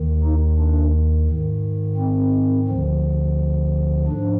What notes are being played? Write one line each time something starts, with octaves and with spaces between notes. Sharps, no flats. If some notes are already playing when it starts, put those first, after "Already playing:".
Already playing: D#2 D#3
D#4
D4
G#2 D#3
C4
D2 D3 F3
G#2 F3 D4